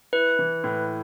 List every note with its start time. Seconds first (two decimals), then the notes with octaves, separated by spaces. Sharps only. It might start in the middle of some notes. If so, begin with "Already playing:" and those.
0.13 E4 B4
0.39 E3
0.64 A2